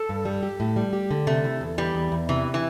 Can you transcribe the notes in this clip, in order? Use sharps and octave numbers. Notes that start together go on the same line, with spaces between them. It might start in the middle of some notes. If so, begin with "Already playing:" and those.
Already playing: A4
G2
G3
G4
A2
G3
G4
D3
C3 A3
E4
E2
E3 G3
E2
E2
C3 E3
E3